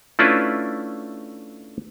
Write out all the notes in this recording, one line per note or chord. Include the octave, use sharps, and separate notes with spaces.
A3 C#4 D4 E4 F4 B4